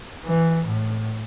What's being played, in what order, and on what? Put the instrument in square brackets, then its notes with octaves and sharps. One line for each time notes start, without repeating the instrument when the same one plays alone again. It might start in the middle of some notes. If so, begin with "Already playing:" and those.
[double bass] E3
A2